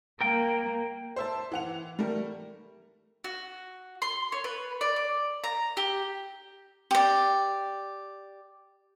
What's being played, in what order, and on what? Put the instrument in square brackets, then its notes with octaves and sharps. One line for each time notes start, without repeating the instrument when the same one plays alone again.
[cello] A#3 [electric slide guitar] A#4 G5
[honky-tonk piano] C5 E5 A5
E3 F#5 F7
G3 A3 A#4
[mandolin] F#4
C6
C#5
B4
D5
D5
A#5
G4
[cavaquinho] G4 D5